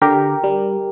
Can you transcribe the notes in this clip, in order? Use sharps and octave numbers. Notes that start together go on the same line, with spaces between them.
D3 G4 A#4
G3